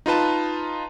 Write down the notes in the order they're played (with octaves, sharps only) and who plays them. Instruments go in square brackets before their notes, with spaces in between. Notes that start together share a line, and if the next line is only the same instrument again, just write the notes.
[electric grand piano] D#4 F4 B4 A5